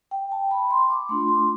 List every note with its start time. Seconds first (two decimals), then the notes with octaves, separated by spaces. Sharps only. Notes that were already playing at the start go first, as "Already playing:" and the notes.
0.11 G5
0.32 A5
0.51 B5
0.71 C6
0.90 D6
1.09 A3 D4 F4 C6
1.28 C6